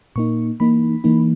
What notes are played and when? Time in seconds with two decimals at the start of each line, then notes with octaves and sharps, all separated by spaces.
0.16 A#2 A#3 D#4 C#6
0.60 E3 A#3 D#4 B5
1.04 E3 A#3 D#4